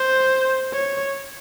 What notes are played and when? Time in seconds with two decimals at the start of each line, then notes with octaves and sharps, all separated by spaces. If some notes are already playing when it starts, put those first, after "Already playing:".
Already playing: C5
0.73 C#5